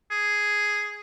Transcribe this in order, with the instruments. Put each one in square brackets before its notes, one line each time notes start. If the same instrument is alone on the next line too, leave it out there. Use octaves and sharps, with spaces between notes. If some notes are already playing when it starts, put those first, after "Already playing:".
[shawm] G#4